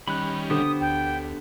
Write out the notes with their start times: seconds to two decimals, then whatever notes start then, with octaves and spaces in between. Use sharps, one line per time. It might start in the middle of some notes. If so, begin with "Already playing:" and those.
0.08 D#3 G3 C#4 B5 F#6
0.50 D3 B3 G4 C5 D#6
0.81 D2 G5